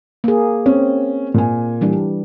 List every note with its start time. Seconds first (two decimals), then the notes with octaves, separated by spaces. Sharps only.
0.24 A#3 G#4
0.66 C4 C#4
1.34 A#2 G#5
1.81 E3 G3 D4